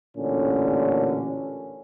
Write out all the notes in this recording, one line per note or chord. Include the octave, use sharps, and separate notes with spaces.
A1 A#2 D3 C#4